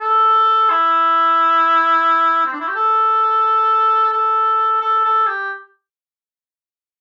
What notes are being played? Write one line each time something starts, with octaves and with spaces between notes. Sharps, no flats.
A4
E4
C4
D4
E4
G4
A4
A4
A4
A4
G4